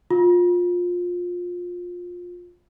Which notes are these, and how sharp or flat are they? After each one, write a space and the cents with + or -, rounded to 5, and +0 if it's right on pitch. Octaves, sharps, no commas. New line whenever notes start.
F4 +20